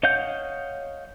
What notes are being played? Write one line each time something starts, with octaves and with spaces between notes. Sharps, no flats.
C#5 D#5 F5 F#5 G6